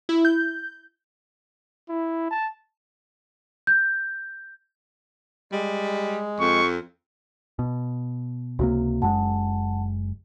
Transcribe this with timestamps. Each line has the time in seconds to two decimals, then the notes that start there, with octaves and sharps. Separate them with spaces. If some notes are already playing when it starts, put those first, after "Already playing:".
0.09 E4
0.25 G6
1.89 E4
2.30 A5
3.67 G6
5.52 G3 G#3
6.40 F2 C#6
7.59 B2
8.59 C#2 C3 A#3 F#4
9.02 F#1 F#2 G#3 F#5 A5